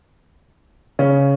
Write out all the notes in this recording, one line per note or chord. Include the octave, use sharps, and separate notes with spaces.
C#3 C#4